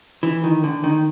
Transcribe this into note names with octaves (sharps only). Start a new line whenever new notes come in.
E3
D#3
D3
D#3